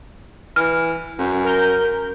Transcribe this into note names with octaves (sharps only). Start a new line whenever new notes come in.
E3 F6
F#2
A#4 G6